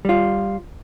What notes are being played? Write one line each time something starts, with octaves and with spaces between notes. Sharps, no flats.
G3 F4